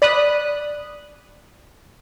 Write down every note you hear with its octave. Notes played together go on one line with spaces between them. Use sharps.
D5 B5 D#6 F#6